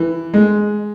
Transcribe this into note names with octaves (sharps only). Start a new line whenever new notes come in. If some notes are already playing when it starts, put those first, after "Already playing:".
Already playing: E3
G#3